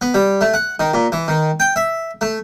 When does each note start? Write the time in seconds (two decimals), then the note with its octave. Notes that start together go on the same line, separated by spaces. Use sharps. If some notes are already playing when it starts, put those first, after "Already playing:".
0.02 B3
0.14 G3
0.41 A3
0.54 F#5
0.80 D#3
0.94 A#2
1.12 E3
1.28 D#3
1.60 G5
1.76 E5
2.21 A3